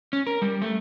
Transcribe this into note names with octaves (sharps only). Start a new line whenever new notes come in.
C#4
A#4
G3
A3